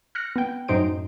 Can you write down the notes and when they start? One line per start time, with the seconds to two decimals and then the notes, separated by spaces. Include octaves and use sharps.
0.15 F6 F#6 A#6 C#7
0.36 B3 G5
0.68 F#2 A2 D#4 C5 D7